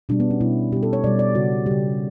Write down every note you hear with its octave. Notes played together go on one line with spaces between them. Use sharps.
B2 G3 D4
B3
C#4
B2 G3 E4
B2 G3 G4
A4
C#5
B2 G3 D5
D5
C#3 G3 F#4
C#3 G3 G4